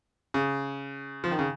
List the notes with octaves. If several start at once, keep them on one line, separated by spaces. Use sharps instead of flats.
C#3
F3
D#3
C#3